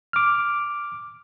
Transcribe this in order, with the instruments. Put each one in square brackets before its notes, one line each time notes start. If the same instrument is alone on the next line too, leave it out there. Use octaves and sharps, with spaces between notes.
[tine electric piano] D6 F6